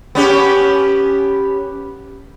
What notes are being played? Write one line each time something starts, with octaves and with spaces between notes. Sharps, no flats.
B3 C#4 G4